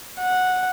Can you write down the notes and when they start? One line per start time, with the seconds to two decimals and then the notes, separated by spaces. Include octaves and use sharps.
0.21 F#5